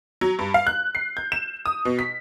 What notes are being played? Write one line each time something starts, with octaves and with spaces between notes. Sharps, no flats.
F#3
G2
F5
F#6
C7
G6
E7
D#6
B2
B6